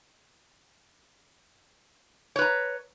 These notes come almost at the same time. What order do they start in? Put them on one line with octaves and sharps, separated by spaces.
C#5 B4 A#5